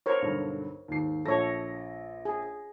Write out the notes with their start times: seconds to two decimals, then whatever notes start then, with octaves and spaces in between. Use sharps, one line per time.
0.06 A#4 C5 C#5
0.22 B1 G2 D3
0.88 D#2 G#2 C7
1.26 A#1 A4 C#5 A#6
2.25 G#4